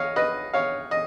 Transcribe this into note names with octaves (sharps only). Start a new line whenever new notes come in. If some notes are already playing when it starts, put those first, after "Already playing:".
Already playing: C#5 D#5 F5
B4 D#5
C#5 F5
D#5